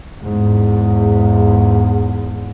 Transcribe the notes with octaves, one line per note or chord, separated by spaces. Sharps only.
E2 G#2